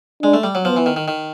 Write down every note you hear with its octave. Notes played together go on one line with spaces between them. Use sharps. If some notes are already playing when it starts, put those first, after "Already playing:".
G#3 D4
A3
G3
F#3
F3 B3
E3
D#3
D#3
D#3